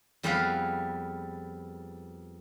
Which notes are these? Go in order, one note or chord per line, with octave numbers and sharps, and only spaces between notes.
F2 G3 B3 G#4 B4 F5